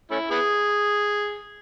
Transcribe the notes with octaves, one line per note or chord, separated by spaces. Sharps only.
A3 C#4 E4
B3 E4 G#4